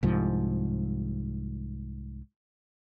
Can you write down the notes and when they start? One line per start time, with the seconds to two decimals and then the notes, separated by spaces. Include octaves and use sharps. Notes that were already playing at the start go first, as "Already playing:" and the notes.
0.03 C2 G#2 F3